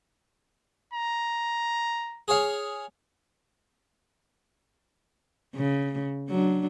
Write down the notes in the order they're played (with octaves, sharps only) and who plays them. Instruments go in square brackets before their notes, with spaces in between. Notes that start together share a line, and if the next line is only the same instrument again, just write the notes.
[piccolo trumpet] A#5
[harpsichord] G#4 C#5 F5
[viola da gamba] C#3
F#3 D4